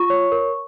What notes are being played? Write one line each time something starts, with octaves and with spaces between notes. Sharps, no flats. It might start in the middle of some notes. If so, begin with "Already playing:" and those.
Already playing: F4 C#6
C#5
A#4